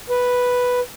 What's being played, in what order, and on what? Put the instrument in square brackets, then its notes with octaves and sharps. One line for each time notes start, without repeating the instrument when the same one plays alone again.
[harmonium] B4